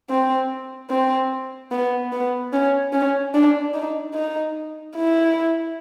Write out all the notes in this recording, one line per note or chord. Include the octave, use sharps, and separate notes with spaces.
C4
C4
B3
B3
C#4
C#4
D4
D#4
D#4
E4